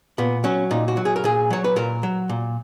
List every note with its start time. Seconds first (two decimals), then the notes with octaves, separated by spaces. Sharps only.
0.18 A#2 B3
0.44 F#3 C#4
0.71 A#2 D#4
0.88 F#4
0.97 F#3
1.05 G#4
1.16 A#4
1.24 A#2 G#4
1.50 F#3 C#5
1.64 B4
1.76 A#2 A#4
2.03 F#3
2.29 A#2